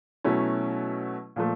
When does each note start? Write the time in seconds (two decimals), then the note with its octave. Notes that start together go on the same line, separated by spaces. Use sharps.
0.24 B2 F#3 A3 C#4 E4
1.36 A#2 F3 A3